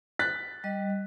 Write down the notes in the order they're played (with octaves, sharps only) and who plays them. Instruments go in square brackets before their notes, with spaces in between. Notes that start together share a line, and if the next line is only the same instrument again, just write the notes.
[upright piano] F#6 A6 B6
[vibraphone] G3 D#5